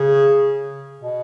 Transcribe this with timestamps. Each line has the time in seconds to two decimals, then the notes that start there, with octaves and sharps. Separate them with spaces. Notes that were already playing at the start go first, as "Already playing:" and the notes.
Already playing: C#3
1.01 B2